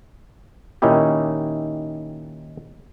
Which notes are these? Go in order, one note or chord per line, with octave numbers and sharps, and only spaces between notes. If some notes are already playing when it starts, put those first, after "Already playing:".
A#2 D#3 C#4 D#4 E4 G4